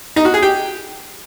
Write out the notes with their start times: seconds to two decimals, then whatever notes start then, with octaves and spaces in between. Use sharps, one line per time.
0.16 D#4
0.25 F#4
0.34 G#4
0.42 G4